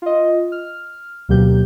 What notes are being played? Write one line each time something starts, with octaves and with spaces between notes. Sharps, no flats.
F4 D#5
F6
D2 B2 F#3 A#3 G4 G6